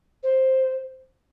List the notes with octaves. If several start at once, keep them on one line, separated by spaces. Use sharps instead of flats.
C5